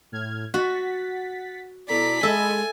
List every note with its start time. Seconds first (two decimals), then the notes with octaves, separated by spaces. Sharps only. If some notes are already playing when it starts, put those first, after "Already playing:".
0.12 A2 F6 G#6
0.54 F#4 F#5 A6 B6
1.89 B2 E4 A4 D5 A#5 B6
2.23 G#3 A4 D#5 E5 G#5 B5